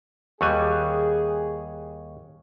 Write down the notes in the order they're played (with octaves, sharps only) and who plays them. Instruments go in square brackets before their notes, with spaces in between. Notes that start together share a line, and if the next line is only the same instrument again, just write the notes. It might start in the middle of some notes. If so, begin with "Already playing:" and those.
[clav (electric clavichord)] D#2 G3 G#5 [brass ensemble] G#4 [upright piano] C#6 F#6